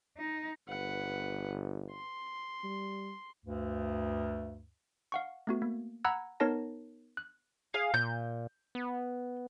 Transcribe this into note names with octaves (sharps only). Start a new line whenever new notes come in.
D#4
G1 B4 F#5
C6
G3
D2 G2
F5 F#5 C#6
A3 B3 F#4
A#3
F#5 A#5 B5 E6 F#6 G#6
B3 D#4 A#4 C#5 A5 A#6
F#6
G#4 F5
A#2 G6
B3